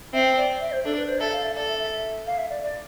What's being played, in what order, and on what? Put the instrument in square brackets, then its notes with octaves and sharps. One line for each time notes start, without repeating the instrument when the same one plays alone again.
[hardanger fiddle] C4 [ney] E5
[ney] D5
E5
C5
[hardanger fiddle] D4 [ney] A4
[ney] B4
C5
[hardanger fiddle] A4 [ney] E5
[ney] F5
E5
[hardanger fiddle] A4 [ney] D5
[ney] E5
E5
E5
F5
E5
D5
D5